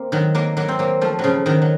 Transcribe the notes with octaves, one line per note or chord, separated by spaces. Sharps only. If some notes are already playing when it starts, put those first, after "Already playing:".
Already playing: A#3 C4
D#3 F#3
F#3 A#3
F#3 A#3
C4
F#3 A#3
F3 A3
F#3
C#3 F3
D#3 F#3
F#3